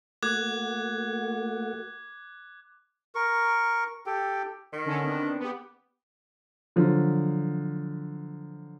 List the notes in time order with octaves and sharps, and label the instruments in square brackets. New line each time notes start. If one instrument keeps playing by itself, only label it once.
[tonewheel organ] A3 A#3 F#4 [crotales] D6 F#6 G#6
[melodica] A#4 C#6
G4 A4 G5
[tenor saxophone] D#3
[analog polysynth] D3 C#4 A4
B3 C4 D4
B3 G4
[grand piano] D3 F3 F#3